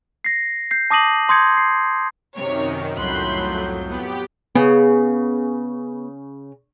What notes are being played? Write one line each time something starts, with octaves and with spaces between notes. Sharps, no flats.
A#6 C7
G6 C7
A5 D6 D#6 A#6 D#7 F#7
C6 D#6 G6 G#6 C#7
C7
F#2 C3 D#3 C#5
C2 F2 A2 F#3 B5 C6 F#6 G6
B3 G4
C#3 B3